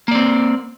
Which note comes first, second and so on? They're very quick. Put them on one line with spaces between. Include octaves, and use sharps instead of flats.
A#3 D5 C4